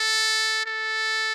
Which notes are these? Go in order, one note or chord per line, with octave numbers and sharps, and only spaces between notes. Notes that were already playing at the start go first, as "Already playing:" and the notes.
Already playing: A4
A4